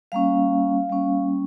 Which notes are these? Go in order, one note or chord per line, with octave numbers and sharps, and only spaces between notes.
G3 A#3 C#4 F5
G3 A#3 C#4